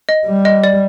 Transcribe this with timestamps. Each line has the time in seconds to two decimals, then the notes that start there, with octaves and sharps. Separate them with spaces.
0.09 D#5
0.27 G3
0.45 D#5
0.64 D5